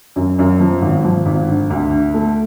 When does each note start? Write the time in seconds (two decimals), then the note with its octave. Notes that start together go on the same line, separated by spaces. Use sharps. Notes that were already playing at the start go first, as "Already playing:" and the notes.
0.16 F#2
0.39 F#2
0.60 F3
0.82 G#1
1.05 F3
1.26 G#1
1.48 D3
1.70 D2
1.92 D3
2.14 A3